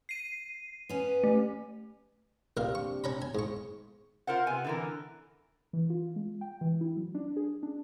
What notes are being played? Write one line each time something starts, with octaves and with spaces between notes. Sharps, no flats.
C7 D#7
B3 C#4
A3
A#1 A#3 C4 D4 G4 F5
C#6
C#4 A#5 B5
B2 G#5
G#2 C#6
F4 A#4 C5 F#5
C3 B3 G#5
D3 E3 A#4
E3
F4
G#3
G5
E3
E4
F#3
D4
G#4
D4